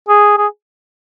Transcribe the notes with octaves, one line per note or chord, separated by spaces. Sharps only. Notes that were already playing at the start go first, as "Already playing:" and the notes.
G#4
G#4